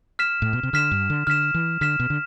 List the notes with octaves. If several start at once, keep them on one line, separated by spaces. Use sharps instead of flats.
F6 B6 E7
A2
B2
C3
D3 F6 B6 E7
G2
D3
D3 F6 B6 E7
E3
D3 F6 B6 E7
B2
D3